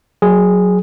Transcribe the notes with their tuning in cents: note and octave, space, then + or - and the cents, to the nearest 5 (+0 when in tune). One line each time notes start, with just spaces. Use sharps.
F#3 -5 G#4 +0